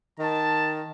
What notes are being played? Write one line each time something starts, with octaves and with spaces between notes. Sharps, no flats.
D#3 A5